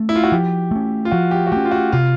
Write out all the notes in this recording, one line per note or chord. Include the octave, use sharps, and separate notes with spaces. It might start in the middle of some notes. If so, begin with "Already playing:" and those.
Already playing: A3 C#4
E4
F4
F#4
F3 G4
A3 C#4
F4
F3 F#4
G4
F#4
A3 C#4 G4
F4
F#4
C3 F4